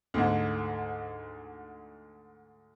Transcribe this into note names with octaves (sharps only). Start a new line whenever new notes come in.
D2 G#2